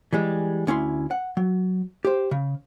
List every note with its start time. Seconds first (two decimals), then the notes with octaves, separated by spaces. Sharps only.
0.13 E3 G3 G#3
0.67 D2 C#4 E4 C6
1.11 F#5
1.37 F#3
2.05 G4 C5
2.31 C#3